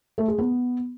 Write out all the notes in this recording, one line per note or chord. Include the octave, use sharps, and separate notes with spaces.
A3
G#4
B3